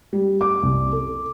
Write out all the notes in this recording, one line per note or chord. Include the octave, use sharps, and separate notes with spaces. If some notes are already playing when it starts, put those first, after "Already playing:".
G3
D6
C2
A4